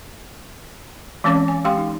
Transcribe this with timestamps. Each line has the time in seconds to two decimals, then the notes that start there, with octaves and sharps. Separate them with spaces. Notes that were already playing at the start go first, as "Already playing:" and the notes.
1.24 E3 G#3 C4 C#4 C#5 D6
1.48 G#5
1.65 G#3 G4 F5 G5 C6
1.77 D#4